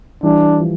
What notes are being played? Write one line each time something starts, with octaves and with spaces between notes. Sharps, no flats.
E3 G3 D4
F3